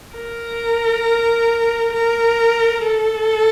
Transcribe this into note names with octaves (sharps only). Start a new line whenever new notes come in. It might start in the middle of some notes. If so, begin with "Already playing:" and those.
A#4
A#4
A4